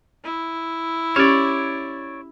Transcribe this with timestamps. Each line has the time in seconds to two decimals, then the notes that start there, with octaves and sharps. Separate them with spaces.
0.24 E4
1.16 C#4 G4 C#5 D5 F6